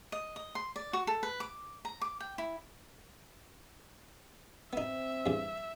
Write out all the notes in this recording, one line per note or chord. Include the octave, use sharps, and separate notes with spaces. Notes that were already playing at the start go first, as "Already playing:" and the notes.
D#5
D#5
C6
D5
F#4
A4
B4
D6
A#5
D6
G5
E4
B3 C4 D#4 E5
E2 G2